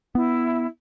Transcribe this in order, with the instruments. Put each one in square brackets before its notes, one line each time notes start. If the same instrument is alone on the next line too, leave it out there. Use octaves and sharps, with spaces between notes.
[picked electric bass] B3 [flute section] E4